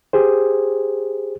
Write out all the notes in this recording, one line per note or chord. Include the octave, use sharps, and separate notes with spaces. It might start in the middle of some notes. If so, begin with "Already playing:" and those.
G4 G#4 C5